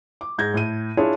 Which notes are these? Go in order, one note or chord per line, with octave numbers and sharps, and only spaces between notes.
D6
G#2 G6 G#6 A#6
A2 D#7
D4 E4 F4 G#4 C#5